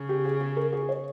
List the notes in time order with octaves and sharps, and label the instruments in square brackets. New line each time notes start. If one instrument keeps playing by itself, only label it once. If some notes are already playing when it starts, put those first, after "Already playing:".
Already playing: [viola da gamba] C#3
[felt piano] G4
G#4
G#4
A#4
G#4
C#5